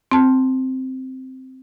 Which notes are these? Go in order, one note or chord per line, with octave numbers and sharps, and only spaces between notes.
C4 A5